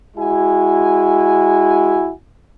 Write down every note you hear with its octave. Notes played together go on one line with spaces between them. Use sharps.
G#3 E4 F#4 G#5